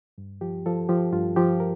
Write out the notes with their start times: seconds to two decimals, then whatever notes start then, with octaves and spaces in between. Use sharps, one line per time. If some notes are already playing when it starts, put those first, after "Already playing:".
0.18 G2
0.41 F3 G4
0.66 F3 A4
0.89 F3 G4
1.12 G2 F4
1.36 F3 G4
1.60 A#4